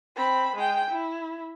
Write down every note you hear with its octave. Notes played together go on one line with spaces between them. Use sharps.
C4 B5
G#3 G5
E4